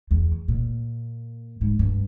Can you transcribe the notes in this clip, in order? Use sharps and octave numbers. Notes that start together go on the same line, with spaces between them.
E2
A#2
G#2
G2